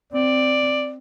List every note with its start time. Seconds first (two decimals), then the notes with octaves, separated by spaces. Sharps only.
0.12 C4 D5